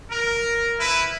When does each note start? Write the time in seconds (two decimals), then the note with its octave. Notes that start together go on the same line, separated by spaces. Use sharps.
0.11 A#4
0.79 E4 B4